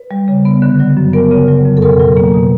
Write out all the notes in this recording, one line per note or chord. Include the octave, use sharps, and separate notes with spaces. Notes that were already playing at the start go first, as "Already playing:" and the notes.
Already playing: B4
G3
C#3
B3
D3
F#3
F#2
B3 A#4
C#3
F#3
F2
A4
B2 A#4
F#3
A#3
B2